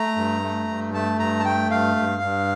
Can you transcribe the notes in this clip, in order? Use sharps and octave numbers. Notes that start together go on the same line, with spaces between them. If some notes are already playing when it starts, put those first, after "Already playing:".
Already playing: A3 A#5
G2
A3
G2
A3 A5
G2 A#5
A5
A3 G5
G2 F5
G2
G2